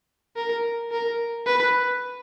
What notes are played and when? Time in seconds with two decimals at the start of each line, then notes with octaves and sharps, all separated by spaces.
0.36 A#4
0.92 A#4
1.46 B4